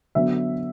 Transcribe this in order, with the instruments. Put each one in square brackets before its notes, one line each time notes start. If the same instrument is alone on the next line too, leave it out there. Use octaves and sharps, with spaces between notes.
[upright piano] D3 F#3 B3 D4 E5